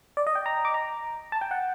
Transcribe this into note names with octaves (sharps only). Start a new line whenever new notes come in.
D5
D#5
G5
A#5
D6
A#5
A5
G5
F#5